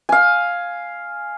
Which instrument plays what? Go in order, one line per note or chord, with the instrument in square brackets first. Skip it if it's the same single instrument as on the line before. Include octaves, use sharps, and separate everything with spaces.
[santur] F5 G#5